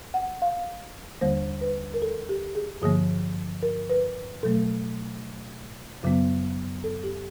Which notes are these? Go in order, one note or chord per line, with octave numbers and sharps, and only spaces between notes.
F#5
F5
D#2 D3 G3 A#3 C5
B4
A#4
A4
G4
G#4
G2 D3 F3 A#3 G#4
A#4
B4
B2 F#3 A3 A4
F#2 C#3 F#3 B3
A4
G4